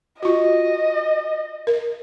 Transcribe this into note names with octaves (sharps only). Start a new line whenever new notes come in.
F4 F#4 D#5
A#4